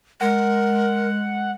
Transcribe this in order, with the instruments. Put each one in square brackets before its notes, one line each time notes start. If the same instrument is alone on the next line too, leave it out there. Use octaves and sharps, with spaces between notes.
[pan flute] G#3 [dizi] A#4 [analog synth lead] F#5